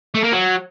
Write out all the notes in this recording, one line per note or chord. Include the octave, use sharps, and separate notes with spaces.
A3
A#3
F#3